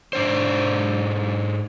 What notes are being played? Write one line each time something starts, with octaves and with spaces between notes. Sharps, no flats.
G#2 D4 C5